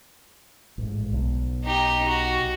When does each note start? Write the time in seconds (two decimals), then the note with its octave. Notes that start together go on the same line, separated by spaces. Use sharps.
0.78 A1 G#2
1.13 B1
1.64 D#4 G4
2.08 F#4